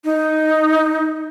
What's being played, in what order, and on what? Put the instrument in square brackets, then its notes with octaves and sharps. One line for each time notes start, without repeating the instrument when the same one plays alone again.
[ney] D#4